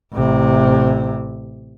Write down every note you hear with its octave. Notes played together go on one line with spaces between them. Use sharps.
A1 C3